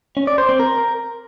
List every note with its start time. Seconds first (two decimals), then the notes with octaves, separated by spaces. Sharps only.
0.17 C#4
0.27 D5
0.38 C5
0.49 C4
0.60 A#4